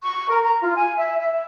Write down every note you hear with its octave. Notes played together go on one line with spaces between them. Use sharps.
C#6
A#4
A#5
F4
G#5
E5
E5